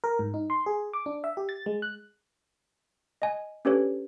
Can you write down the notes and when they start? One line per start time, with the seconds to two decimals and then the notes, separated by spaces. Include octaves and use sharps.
0.04 A#4
0.19 G#2
0.34 D#4
0.50 C6
0.66 G#4
0.93 D6
1.06 D4
1.24 E5
1.37 G4
1.49 A6
1.66 G#3
1.82 F#6
3.22 D#5 G#5
3.65 C#4 D4 G4 A4 B4 C#5